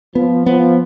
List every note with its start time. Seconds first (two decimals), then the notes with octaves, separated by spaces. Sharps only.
0.15 F3 B3
0.46 F3 B3